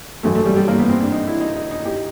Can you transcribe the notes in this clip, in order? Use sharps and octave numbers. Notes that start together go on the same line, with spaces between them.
G#1 F#2 D#3 A3
A3
G3
G3
A#3
B3
C4
D4
D#4
E4
D#4
D#4
D#4
G4